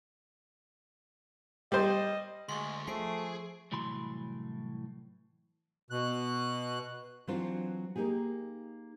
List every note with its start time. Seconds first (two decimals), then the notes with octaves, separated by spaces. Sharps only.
1.72 G3 C5 D#5
2.49 D2 G#3 C6 C#6
2.87 F3 A3 G#4 C7 D7
3.72 C2 A2 E3 F#3 B5 C6
5.91 B2 F#6
7.27 E3 F#3 C4 D4 F4 C5
7.96 A#3 D#4 G4 G#4